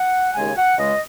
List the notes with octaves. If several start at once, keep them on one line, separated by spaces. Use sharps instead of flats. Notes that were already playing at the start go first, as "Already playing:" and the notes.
Already playing: F#5
D#2 C#3 G#3 G#5
F#5
C#2 C#3 G#3 D#5